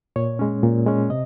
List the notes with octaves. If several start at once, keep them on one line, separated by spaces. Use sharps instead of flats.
A#2 C#5
G#3 C#4
A#2
G#3 C#4
C3 D#5